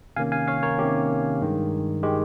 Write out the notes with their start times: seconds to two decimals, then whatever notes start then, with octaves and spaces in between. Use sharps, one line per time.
0.16 C3 D#3 A#3 C#4 F5 G#5
0.32 F5 G#5
0.48 C#5 F5
0.63 A#4 C#5
0.78 C3 D#3 A#3 C#4 G4
1.41 G2 D#3 G#3
2.03 D#3 G#3 G4